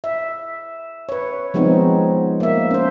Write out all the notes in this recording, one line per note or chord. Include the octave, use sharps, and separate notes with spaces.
E5
B4 C#5
F3 G#3 B3 C4 D#4
A#3 E5
C#4 C5